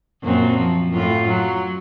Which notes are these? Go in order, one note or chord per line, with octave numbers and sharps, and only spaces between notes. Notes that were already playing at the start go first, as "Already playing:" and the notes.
F#2 A#2 C4
F3
F#2 A2 F4
F#3